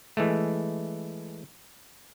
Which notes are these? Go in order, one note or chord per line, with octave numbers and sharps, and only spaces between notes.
E3 G#3 A3